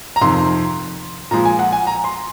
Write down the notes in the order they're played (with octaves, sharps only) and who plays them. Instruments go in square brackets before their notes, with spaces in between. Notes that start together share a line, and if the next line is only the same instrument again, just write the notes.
[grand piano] A#5
F2 C3 D#3 C6
A#2 F3 G#3 A#5
G#5
F#5
G#5
A#5
C6